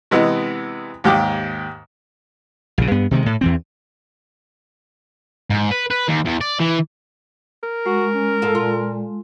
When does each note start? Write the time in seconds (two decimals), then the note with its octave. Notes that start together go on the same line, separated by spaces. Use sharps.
0.11 C3 E3 G#3 B3
1.04 D#2 G#2 G4 D6
2.78 A#1 C#3
2.91 G2 B3
3.11 C3 D#3 F#3 G#3
3.26 A2
3.41 E2 E3 C4
5.50 G#2
5.71 B4
5.91 B4
6.08 D#2
6.25 E2
6.41 D5
6.59 E3
7.63 A#4
7.86 G#3 F#4
8.14 C#4
8.42 G#2 F4 A4
8.55 A#2 F4